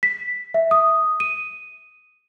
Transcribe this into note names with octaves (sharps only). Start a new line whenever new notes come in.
B6
E5
D#6
D#7